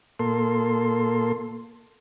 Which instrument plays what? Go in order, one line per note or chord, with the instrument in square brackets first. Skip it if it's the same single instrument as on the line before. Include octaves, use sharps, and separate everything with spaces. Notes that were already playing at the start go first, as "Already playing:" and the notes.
[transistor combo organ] A#2 A#3 A4 C6